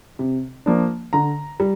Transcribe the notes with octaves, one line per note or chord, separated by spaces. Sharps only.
C3
F3 A#3 D4
D3 A#5
G3